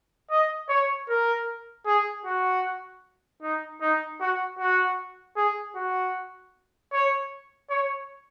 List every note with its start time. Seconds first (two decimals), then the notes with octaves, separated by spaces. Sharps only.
0.31 D#5
0.69 C#5
1.09 A#4
1.86 G#4
2.26 F#4
3.42 D#4
3.81 D#4
4.20 F#4
4.59 F#4
5.37 G#4
5.76 F#4
6.93 C#5
7.70 C#5